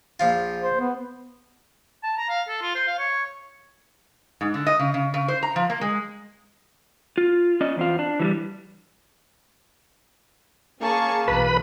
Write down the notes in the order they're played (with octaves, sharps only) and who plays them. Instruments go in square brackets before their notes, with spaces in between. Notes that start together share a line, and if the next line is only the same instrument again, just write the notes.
[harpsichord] A#1 F3 F4
[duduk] C5
B3
[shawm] A5
A#5
F5
A4
F4
C5
F5
C#5
[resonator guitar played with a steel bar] G#2
D3
D#5
C#3
C#3
C#3
C5
A#5
F3
A#3
G#3
[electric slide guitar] F4
C#4 D5 D#5
E2 C4 F4
D4
E3 F#3 G3
[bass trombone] A#3 [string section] C#4 G#4 C#6 [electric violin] A5
[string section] B1 E3 [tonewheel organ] B4 B5